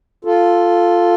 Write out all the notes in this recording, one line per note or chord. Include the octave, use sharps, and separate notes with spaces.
F4 A4